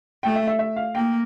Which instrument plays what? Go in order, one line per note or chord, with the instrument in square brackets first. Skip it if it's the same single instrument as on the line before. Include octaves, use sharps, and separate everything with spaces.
[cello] A3 [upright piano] G5
[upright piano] E5
E5
E5
F5
[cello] A#3 [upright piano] G5